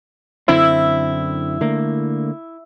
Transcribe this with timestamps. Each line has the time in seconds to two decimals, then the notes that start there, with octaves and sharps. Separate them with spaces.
0.48 F#2 D3 C4 E4
1.61 D3 A3 A#3